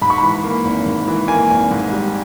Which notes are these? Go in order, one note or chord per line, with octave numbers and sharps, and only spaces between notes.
G#2 B5
C#6
E3 B5
A#3
G#1
G#2
E3
A#3 G#5
G#1
G#2
G3